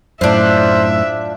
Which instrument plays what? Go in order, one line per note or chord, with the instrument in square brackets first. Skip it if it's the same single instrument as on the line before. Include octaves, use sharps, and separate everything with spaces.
[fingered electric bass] F#2 A2 [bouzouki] D4 F4 [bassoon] C5 [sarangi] E5